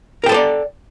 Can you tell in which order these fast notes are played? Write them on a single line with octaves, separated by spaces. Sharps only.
A#4 G5 A4 C5 D5